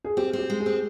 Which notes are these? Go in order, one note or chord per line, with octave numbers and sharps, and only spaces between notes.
G#4
C4 G4
C4 G4
G#3
G#4
C4